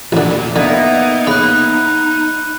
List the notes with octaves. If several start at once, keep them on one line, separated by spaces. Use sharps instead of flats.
A1 D#2 A#2 D3
D3 A#3 B3 D#4 E4
C#3 B5 F#6